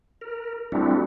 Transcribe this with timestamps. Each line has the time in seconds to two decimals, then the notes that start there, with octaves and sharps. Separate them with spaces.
0.21 A#4
0.72 G3 A3 C4 D4 E4 F#4